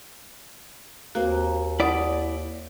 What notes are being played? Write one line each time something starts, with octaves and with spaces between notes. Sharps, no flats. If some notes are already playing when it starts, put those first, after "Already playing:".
D#2 A#3 C4 F#4
E4 D5 F#5 D#6